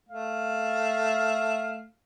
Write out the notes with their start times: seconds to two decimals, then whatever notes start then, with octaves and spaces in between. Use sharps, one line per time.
0.09 A3 F5